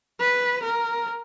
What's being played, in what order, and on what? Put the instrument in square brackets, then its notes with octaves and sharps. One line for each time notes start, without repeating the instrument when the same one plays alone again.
[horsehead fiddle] B4
A#4